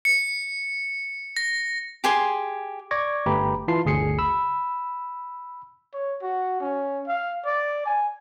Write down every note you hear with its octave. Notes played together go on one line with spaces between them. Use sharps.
C#7
A#6
G4 G#4 C6
D5 C#6 D6 G#6 A#6
G1 A3 G4 B4 A#5 B5
E3 E4 F4 A5 C6 C7
G1 D2 G#4 C7 C#7
B5 E6
C#5
F#4
C#4
F5
D5
G#5